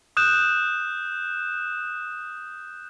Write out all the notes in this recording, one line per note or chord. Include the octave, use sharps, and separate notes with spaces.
D#6 F#6 G6 E7